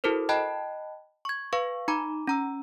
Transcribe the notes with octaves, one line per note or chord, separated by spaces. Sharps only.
E4 F#4 A4 A#4 C5
D#5 G5 A5 B5 F#6
C#6 G#6
B4 F5 C#6
D#4 A#5 B5 D6
C#4 A#5 E6